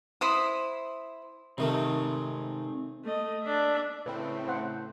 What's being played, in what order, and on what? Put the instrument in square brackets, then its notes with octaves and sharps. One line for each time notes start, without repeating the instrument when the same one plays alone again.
[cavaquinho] E4 C5 D#6
[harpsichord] C3 D#3 A3 [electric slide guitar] C4 D#4
[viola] A3 D#5
D4 E5
[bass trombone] A2 [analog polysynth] C#3 A3 C4 [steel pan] B4 G5
[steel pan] C5 F#5